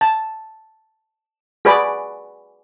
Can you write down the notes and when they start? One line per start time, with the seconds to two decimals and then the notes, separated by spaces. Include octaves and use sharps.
0.01 A5
1.65 F#4 G#4 B4 D5 B5 D6